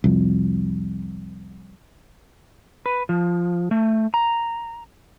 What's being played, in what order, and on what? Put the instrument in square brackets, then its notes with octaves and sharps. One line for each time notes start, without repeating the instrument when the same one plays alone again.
[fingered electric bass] C2 F2
[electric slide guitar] B4
F3
A3
A#5